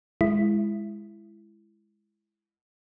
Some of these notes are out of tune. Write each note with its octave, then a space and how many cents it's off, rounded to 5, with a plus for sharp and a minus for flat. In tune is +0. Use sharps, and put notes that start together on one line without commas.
G#3 -5 E4 +20